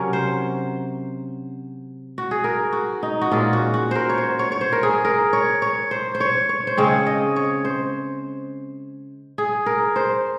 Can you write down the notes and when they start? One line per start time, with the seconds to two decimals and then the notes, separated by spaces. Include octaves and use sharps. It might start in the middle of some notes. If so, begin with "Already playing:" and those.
Already playing: C3 F#3 C#4 A#4
0.13 C5
2.18 F#4
2.31 G#4
2.44 A#4
2.73 F#4
3.03 D#4
3.21 F#4
3.31 A#2 G#3 C#4 F4
3.53 F#4
3.74 F#4
3.91 A#4 C5
4.09 C#5
4.18 C5
4.39 C#5
4.52 C#5
4.61 C5
4.72 A#4
4.83 G#4
5.05 A#4
5.33 C#5
5.62 C#5
5.91 C5
6.15 C5
6.20 C#5
6.49 C#5
6.67 C5
6.77 C#3 G#3 C4 C#5
7.06 D#5
7.36 C#5
7.65 C5
9.38 G#4
9.66 A#4
9.96 C5